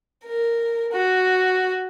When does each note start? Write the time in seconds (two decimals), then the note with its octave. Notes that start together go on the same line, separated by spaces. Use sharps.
0.25 A#4
0.92 F#4